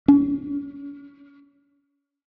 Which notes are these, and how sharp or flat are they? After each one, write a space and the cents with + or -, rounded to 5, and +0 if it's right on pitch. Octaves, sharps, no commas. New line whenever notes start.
C#4 +35